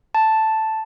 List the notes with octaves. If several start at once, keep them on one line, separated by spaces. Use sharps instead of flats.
A5